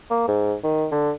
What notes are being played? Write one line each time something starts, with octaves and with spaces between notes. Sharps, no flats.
A#3
G#2
D#3
D3